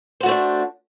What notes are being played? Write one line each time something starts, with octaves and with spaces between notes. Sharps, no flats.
A3 C4 D4 F#4 C5